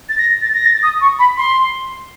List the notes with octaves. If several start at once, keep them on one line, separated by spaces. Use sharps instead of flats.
A6
A#6
A6
A#6
A6
D#6
C#6
B5
C6